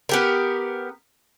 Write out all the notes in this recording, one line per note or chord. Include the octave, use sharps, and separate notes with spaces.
B3 G4 A#4